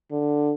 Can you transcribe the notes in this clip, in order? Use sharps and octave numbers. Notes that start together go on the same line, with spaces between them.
D3